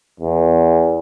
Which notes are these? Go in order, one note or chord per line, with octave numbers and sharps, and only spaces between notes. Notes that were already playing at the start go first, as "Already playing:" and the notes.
E2